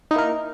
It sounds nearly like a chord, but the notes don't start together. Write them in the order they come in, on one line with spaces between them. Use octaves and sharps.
D#4 E4 A#3 A#4